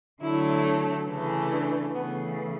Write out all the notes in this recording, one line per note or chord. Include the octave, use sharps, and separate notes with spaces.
D3 F#3 A3 E4
C#3 E3 A3
D4
C#3 E3 A3 B3